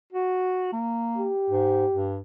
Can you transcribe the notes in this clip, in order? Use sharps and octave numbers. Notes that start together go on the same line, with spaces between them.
F#4
A#3
G4
G#2
G2